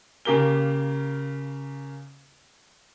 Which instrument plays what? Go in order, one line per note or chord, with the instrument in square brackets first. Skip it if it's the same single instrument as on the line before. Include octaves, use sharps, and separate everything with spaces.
[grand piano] C#3 A#3 G4 A#4 G7